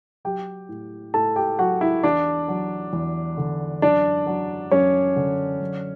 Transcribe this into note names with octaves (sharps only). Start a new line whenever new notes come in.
F#3 G4 G5
A2
A2 A4 A5
G4 G5
F#3 F#4 F#5
E4 E5
E2 D4 D5
F#3
E2
D3
F#2 D4 D5
F#3
F#2 C#4 C#5
D3
F#2